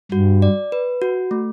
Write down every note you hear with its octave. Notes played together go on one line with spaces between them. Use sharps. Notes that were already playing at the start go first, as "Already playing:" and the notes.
G2 F#4
D5
B4
F#4
A3